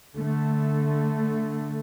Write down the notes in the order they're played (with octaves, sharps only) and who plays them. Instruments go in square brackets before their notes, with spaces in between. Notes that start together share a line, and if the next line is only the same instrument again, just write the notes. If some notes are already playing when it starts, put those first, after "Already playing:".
[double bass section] D3 A3